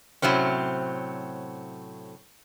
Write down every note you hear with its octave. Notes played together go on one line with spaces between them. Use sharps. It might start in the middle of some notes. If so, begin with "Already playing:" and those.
A2 C3 F#3 C4 C#4